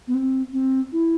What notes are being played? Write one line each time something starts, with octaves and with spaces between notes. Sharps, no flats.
B3
C4
C4
E4